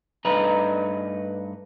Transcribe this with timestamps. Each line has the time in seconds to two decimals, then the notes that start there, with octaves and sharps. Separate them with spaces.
0.25 G2 A3 D#4 B4 A#5